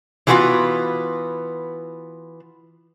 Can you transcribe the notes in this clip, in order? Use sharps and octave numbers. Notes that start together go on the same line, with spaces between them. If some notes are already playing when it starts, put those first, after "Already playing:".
E3 F#3 A3 B3 F4 F#4